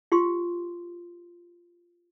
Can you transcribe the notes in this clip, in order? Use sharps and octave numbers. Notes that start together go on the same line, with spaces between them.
F4 G4 C6